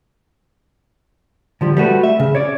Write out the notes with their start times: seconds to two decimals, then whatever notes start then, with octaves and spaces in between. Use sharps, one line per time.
1.61 D3 F3 G3
1.77 G3 A3 F#4 B4
2.03 E5
2.20 C#3
2.35 C#5 D5